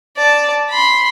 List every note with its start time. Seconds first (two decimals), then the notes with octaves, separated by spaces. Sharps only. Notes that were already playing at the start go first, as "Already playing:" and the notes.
0.17 D5 A5
0.70 B5 C6